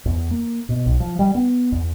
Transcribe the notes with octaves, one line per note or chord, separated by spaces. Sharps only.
E2
A#3
B2
B1
F3
G3
B3
E2